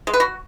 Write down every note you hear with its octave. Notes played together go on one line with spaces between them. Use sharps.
G#3
B4
F#4